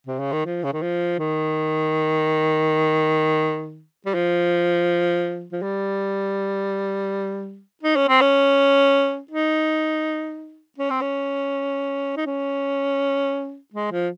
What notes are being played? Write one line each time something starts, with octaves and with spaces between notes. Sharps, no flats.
C3
C#3
D#3
F3
C#3
D#3
F3
D#3
G3
F3
F3
G3
D#4
C#4
C4
C#4
D#4
C#4
C4
C#4
D#4
C#4
G#3
F3